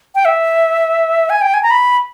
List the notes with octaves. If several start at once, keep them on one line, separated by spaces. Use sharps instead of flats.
G5
E5
G#5
G5
G#5
A#5
B5